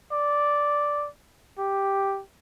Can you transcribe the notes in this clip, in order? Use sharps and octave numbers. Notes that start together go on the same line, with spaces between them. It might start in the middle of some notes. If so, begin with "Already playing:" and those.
D5
G4